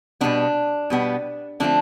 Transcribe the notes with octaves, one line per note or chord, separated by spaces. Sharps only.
B2 G3 B3 D4
B2 G3 B3
D3 F3 A3 C4 D4